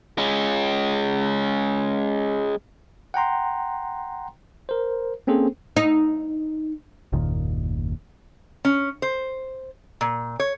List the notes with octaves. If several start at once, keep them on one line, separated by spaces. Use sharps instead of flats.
G#3 C#4
F#5 G5 A#5 C6
A#4 C5
A#3 C4 C#4 G#4 A4 C5
D#4
F#1 D#2 A#2 D#3
C#4
C5
A#2
C#5